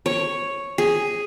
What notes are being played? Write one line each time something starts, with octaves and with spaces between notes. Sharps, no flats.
C#5
G#4